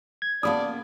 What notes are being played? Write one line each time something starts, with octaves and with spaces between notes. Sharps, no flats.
G#6
C#3 A#3 B3 D5 A5 B5 D#6